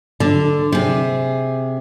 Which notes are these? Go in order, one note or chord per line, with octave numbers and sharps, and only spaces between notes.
D3
C3 G#4